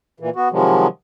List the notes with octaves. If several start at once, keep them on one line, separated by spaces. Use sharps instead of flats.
A#2 E3
B3 F#4
C3 D#3 F3 F#3 G#3